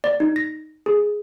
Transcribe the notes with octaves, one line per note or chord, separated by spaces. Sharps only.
D5
D#4
A#6
G#4